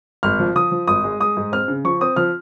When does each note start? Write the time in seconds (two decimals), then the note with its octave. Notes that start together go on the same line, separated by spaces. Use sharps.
0.23 G#1 F6
0.39 F3
0.55 F3 D#6
0.72 F3
0.88 G#1 D#6
1.04 G#3
1.20 G#3 D#6
1.37 G#2
1.52 C4 F6
1.68 C#3
1.84 F3 C#6
2.01 C4 D#6
2.16 F3 F6